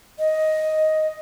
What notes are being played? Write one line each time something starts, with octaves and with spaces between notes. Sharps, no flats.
D#5